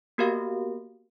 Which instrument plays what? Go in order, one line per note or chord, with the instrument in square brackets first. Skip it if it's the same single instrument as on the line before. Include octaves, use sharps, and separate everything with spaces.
[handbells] A#3 B3 F#4 G4 A#4 F5